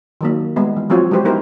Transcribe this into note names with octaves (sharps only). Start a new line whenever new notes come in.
D#3 F#3 A#3
G3 G#3 B3
E3
F3 F#3 C4 F4 F#4 C#5
F#3 G#3 E4 G4 B4 C5
B3 D#4 E4 G4 A#4 C5